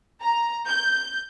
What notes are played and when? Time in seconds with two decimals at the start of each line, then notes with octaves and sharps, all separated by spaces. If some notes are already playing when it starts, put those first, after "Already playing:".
0.22 A#5
0.68 G6